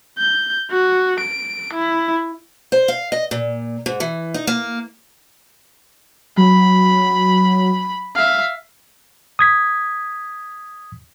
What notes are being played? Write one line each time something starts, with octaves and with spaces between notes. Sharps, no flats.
G6
F#4
D7
E4
C5
F5
D#5
A#2
G#2
E3
D#4
A#3
F#3 B5
E5 F5
D#6 G#6 B6